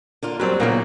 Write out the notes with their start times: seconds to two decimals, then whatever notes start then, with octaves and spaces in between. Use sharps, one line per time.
0.23 D3 A#3 F4
0.40 F#3 G3 A#3 C4
0.60 B1 A#2 C#3 F#3 A#3